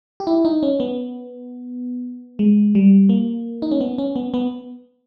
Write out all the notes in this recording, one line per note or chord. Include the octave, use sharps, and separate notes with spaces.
G4
E4
D#4
C#4
B3
G#3
G3
A#3
D#4
C#4
B3
C#4
B3
B3